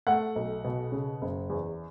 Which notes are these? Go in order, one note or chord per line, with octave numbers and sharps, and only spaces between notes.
A3 F#5
B1
B2
C#3
F#1
E2